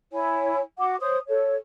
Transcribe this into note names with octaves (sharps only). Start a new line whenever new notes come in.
E4 C#5 G#5
F#4 F#5 D6
C5 C#5 D#6
A4 C#5